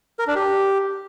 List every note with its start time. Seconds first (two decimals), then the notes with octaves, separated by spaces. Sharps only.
0.19 A#4
0.27 D4
0.36 G4